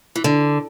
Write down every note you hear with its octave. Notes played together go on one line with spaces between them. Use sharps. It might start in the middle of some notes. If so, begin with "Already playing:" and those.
E3
D3